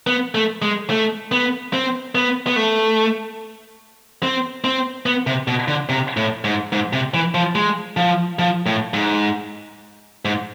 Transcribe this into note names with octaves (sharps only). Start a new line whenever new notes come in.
B3
A3
G#3
A3
B3
C4
B3
B3
A3
C4
C4
B3
C3
B2
D3
C3
A2
G#2
G#2
C3
E3
F3
G#3
F3
F3
A2
G#2
G#2